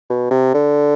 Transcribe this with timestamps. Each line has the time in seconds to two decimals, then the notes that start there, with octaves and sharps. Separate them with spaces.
0.10 B2
0.31 C3
0.54 D3